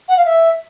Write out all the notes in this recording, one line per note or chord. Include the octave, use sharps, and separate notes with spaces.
F#5
F5
E5